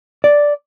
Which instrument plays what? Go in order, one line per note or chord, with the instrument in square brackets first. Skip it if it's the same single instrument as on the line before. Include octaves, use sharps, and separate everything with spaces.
[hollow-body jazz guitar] D5